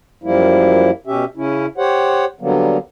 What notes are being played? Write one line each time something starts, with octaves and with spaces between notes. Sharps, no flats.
F#2 F3 G3 A#3 E4
B2 C#4 G4 E5
C#3 C#4 E4
G4 C5 C#5 F#5
D3 F#3 G3 A#3 B3